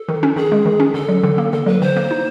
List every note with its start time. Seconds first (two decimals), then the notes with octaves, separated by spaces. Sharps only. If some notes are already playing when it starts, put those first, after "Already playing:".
Already playing: A4
0.09 D#3
0.23 C#4
0.36 D#3 G#4
0.52 G#3
0.66 D#3
0.80 C#4
0.94 D3 A4
1.08 F#3
1.24 D3
1.38 A#3
1.52 D3 A4
1.66 F#3 B4
1.81 D3 C5
1.96 A#3
2.11 D#4